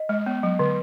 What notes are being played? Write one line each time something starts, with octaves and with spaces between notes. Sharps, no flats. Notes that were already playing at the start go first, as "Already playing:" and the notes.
Already playing: D#5
G#3
B3
F#3
D3